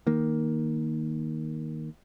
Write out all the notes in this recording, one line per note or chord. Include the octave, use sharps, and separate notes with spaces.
D#3 A#3